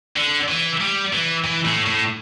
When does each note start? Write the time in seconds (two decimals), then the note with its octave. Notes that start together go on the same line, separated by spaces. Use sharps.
0.16 D3
0.48 E3
0.80 G3
1.13 E3
1.44 E3
1.65 A2
1.86 A2